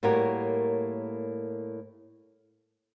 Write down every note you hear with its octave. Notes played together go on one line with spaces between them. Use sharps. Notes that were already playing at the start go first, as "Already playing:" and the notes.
A2 G3 A#3 F#4 A#4 C#5